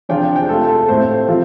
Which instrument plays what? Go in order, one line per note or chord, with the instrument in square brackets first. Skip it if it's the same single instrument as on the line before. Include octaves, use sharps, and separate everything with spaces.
[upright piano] C3 F3 D4 F4 G5
G5
C3 A3 F4 A4
A4
A2 A3 C4 C5
C3 F3 C4 F4